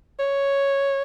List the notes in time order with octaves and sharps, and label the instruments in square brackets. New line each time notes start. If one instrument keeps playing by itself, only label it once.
[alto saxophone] C#5